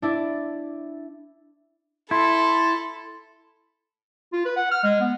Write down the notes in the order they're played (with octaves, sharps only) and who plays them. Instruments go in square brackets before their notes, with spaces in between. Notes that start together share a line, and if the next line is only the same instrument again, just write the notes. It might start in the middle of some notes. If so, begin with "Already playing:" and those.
[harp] D4 E4 D5
[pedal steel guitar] E4 [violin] A4 B5 [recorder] C6
[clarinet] F4
B4
F#5
F6
G#3
B3